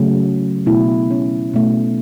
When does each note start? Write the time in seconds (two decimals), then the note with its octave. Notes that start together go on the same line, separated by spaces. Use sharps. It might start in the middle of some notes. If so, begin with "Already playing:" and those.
Already playing: C#3 F#3 A3
0.66 B2 A3 E4
1.11 C#4
1.53 B2 A3